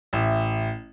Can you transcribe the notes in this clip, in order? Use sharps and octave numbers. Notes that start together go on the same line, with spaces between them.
A1 E5